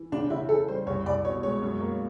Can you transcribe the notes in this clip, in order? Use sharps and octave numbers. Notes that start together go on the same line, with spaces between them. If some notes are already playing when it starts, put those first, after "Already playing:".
Already playing: E3
C#3 D4
C#3 E4
E3 A4
G3 C5
C2 C#5
C2 D5
B2 C#5
G#3 C#5
F#2
A#3